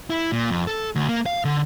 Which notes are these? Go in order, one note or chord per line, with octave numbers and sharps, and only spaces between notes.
E4
A#2
F2
A4
D2
A#3
F5
D3